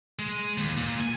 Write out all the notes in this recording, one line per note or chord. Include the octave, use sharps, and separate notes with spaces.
G#3
D#2
A#2
G#5